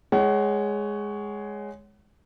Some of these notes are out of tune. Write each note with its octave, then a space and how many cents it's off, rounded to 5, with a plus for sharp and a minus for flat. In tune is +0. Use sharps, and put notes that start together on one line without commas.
G#3 +0 C#5 +5 F#5 +30